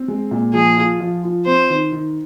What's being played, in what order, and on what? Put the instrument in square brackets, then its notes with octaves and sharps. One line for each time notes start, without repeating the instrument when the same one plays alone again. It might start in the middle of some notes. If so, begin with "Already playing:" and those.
Already playing: [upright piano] C4
G#3
A#2
[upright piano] F3 [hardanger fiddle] G#4
[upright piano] F4
F3
F4
[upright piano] C4 [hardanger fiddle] C5
[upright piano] D#3
D#3